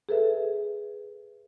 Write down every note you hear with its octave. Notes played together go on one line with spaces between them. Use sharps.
G#4 A4 B4 E5